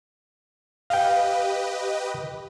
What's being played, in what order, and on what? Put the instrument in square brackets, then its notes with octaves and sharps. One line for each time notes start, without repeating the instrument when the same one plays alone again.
[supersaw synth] G4 B4 D#5 [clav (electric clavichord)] F5 G5